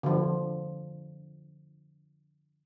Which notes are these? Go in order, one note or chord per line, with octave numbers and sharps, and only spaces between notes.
D3 F3